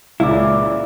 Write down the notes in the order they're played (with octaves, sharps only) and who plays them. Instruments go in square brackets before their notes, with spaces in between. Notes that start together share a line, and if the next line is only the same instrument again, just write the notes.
[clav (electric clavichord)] C#2 [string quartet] A#2 C#3 E3 [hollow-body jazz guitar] E4 [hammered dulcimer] D5 E5 F5